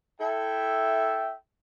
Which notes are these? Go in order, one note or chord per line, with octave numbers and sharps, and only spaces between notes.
E4 A4 E5 G5